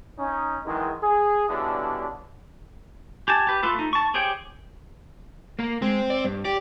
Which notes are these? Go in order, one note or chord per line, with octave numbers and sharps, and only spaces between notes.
C#4 D#4
D#3 E3 F#3 G#3
G#4
G2 B2 D3 C#4 D4 E4
G4 G#5 A5
G4 B4
A3 F4 A4 B4
A3 D#4
A5 C#6
G4 G#4 C5 C#5 G5
A#3 A#4
G#3 C4
D5
G2
G4 D5